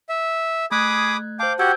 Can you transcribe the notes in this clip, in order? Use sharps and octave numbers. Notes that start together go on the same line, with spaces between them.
E5
A3 G#4 B5 D6 D#6 F#6 G#6
C5 F5 G5 A5 D6
F#4 G4 F#5 G5 E6 G#6